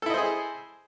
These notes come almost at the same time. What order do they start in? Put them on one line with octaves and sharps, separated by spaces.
A4 E4 D#5 C5 G#4